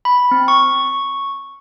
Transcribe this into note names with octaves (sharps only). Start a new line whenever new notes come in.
B5
C4
C#6